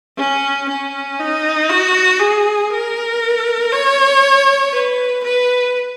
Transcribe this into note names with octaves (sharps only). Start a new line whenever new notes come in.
C#4
C#4
D#4
F#4
G#4
A#4
C#5
B4
B4